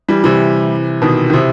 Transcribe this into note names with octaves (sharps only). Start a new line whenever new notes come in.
E3 G3
C3 E3
B2 D#3
D#3
C3 E3